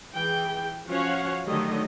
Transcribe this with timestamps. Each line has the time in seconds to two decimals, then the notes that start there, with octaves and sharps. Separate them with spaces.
0.13 E3 G#4 G5
0.88 F3 C#4 F#4 C#5 F5 F#5
1.47 D3 D#3 F#3 A3 G4 D#5